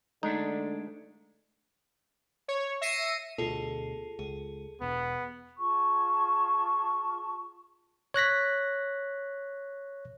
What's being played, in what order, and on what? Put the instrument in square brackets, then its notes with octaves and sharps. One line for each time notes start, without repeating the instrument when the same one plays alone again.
[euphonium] D3 [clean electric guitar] G#3 A3 D4 [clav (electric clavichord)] D#4
[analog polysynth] C#5
E5 A#6 C7 C#7 D#7
[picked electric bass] D2 B2 [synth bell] F4 G#4 [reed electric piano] A4
[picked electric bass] C#2 [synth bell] G#4
[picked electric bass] E1 [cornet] B3
[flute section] F4 G#4 A5 C#6
[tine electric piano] C#5 F#6 A#6 B6